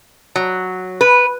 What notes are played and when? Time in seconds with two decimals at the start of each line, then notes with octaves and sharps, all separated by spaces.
0.36 F#3
1.01 B4